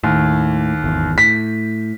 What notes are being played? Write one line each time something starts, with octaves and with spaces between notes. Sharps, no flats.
D#2 A2
G#1 E2
A2 B6